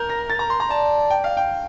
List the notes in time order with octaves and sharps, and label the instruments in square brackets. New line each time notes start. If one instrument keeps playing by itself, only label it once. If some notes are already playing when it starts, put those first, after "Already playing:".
Already playing: [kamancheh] A#4 [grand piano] G6
[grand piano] A#6
A6
A#5
C6
A#5
[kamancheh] D5 [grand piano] A5
[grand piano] G5
F5
G5